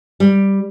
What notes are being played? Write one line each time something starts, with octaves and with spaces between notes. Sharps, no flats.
G3